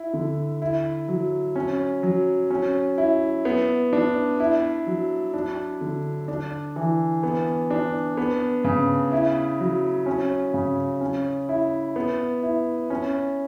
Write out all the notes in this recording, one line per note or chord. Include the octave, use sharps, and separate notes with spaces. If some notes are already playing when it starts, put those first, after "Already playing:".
Already playing: E4
D3
E4
F#3
C#4
F#3
C#4
E4
B3
D4
E4
F#3
D4
D3
D4
E3
B3
D4
B3
C#3
E4
F#3
C#4
C#3
C#4
E4
B3
E4
C#4